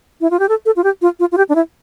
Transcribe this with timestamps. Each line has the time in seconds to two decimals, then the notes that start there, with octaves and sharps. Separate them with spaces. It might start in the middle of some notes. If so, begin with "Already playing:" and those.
0.21 E4
0.30 F4
0.39 G4
0.49 A4
0.65 A4
0.76 F4
0.84 G4
1.02 F4
1.19 F4
1.32 F4
1.37 G4
1.49 D4
1.55 E4